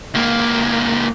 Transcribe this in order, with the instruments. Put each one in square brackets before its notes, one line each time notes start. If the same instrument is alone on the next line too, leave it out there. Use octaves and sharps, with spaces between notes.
[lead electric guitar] C#2 A#3